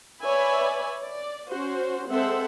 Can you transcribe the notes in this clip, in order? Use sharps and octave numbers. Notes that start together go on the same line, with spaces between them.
B4 C#5 D5 E5 G#5 B5
D5
C#4 F#4 C5
G#3 C4 A4 C5 E5 F#5